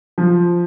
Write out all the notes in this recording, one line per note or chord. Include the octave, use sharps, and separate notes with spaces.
F3